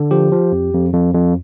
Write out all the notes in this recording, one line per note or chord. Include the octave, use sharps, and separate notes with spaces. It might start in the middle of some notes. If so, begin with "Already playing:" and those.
Already playing: D3
F3 G4
F3
F2
F2
F2
F2